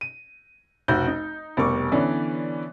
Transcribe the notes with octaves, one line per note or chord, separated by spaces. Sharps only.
D#7
F1 B1 F#4 G6
D#4
F1 B2 G3 A#4 C#6 D6
D3 E3 B3 C#4 D5